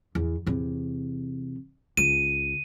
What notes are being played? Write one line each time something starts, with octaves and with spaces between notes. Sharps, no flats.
E2
E2 C3
C#2 D#7